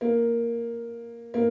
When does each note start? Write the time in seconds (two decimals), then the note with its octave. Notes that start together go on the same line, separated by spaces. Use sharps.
0.01 A#3
1.34 A#3